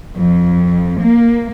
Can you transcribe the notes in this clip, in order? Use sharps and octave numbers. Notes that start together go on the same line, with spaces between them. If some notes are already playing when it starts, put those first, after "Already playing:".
F2
A#3